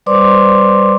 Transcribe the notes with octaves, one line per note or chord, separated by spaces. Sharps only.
G3 B4 C5 D5 C6 D6